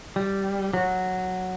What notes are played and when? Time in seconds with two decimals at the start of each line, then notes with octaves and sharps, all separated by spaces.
0.16 G3
0.73 F#3